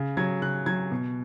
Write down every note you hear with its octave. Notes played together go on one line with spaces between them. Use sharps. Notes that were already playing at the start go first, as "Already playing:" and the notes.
Already playing: C#3
F#3 G#6
C#3 F#6
F#3 G#6
B2